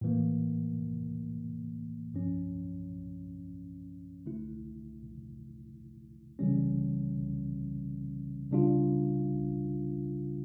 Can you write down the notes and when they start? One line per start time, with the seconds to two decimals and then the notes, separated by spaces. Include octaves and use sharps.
0.01 A2 E3 A#3
2.14 G2 F3 C#4
4.26 D3 A3 E4
6.39 C#3 E3 G3 C#4
8.51 C#3 G3 D4 F4